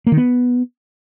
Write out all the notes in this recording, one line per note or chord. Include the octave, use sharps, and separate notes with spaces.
A#3
D#3
B3